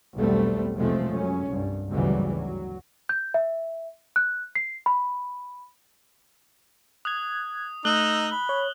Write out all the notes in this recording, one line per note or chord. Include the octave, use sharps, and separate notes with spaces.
B1 E2 G3 A3 B3 C4
F1 B1 F3 G#3 A3 C4
F#2 C#4
C2 G2
G#1 D2 C#3 E3 F#3 G3
F#3
G6
E5
F#6
C7
B5
D#6 F#6 G#6
A3 D#4 D#6 E6 F#6 F#7 G7
B5
C#5